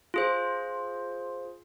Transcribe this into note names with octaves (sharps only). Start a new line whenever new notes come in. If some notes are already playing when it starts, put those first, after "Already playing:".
F4 G#4 C5